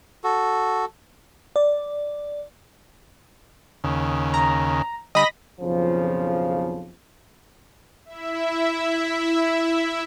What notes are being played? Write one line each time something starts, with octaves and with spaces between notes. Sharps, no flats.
F#4 A4
D5
D#2 C#3
A#5
D3 G3 D#5 B5 A#6
B1 F2 C#3 F3
E4 E5